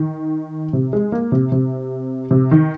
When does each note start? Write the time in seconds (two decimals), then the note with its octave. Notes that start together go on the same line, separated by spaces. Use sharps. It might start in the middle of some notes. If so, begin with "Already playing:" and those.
Already playing: D#3
0.73 C3
0.93 G#3
1.12 A#3
1.32 C3
1.52 C3
2.31 C3
2.51 D#3